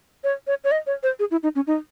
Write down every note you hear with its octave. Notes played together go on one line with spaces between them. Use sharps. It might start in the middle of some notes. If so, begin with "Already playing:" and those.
C#5
C#5
C#5
D#5
C#5
C5
G#4
E4
D#4
C#4
D#4